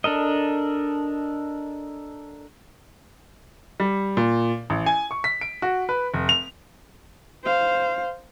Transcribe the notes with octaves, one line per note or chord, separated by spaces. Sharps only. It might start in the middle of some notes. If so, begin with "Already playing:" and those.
D4 A4 A#4 D#5
G3
A#2
A1
G#5
C#6
B6
D7
F#4
B4
F1
F7
C5 F5